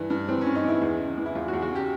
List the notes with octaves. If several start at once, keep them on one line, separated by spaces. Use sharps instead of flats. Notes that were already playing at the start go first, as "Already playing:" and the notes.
Already playing: G2 E3
G2
E3 C4
C#4
G2
D#4
E3 E4
E2
C#3
E3
E4
E2 F4
F#4
E2
F#4
C#3 G4